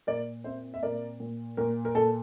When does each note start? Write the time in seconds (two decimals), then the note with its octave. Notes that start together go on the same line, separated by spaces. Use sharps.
0.07 A#2 A#4 D5
0.44 C4 C5 E5
0.74 E5
0.83 A#2 A#4 D5
1.20 A#2
1.57 A#2 A#4
1.85 A#4
1.95 A#2 A4